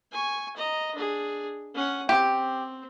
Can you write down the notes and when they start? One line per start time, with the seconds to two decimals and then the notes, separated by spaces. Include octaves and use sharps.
0.12 G#5 C#6
0.57 D#5 A#5
0.95 D4 G#4
1.74 C#4 F#5
2.09 C4 G4